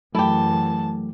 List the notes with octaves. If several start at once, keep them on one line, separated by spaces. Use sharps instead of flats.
F#2 E3 F#3 A3 E4 G4 A5